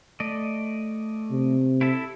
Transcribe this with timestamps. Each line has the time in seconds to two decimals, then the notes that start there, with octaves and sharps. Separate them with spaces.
0.20 A3 D5 D#5
1.31 C3
1.81 E4 A4 E5